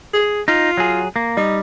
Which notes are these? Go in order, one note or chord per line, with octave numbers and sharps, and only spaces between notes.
G#4
D#4 F4
F#3 G#4
A#3
G3 D#4